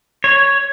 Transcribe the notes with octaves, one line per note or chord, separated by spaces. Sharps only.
C#5